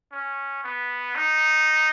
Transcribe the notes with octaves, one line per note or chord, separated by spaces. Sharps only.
C#4
B3
D#4